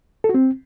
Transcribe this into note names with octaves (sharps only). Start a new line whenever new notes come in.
A4
F#4
C4